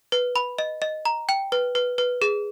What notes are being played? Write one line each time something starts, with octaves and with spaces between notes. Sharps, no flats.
B4
B5
D#5
D#5
A#5
G5
B4
B4
B4
G#4